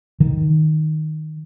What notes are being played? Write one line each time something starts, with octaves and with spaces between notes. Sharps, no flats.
D#3